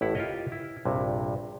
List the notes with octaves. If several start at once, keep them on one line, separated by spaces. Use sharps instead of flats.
A1 A2 E4 F#5
F4 G4 A#4 C#5 D#5
E4
A#1 G2 C3